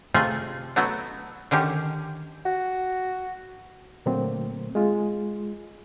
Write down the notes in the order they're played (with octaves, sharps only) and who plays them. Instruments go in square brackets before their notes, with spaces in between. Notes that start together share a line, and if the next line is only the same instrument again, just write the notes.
[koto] C3 A3 F4 G#4
F#3 A3 B3 E4 F#4
D3 D#3 C#4 G4
[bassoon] F#4
[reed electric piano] A#2 D3 F#3 A3 A#3 C4
G#3 F4